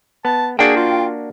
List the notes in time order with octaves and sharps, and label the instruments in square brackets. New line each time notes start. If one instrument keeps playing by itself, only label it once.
[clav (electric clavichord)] B3 [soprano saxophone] A5
[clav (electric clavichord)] A#3 D4 F#4 [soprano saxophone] G#4 [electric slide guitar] G5
[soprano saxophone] F4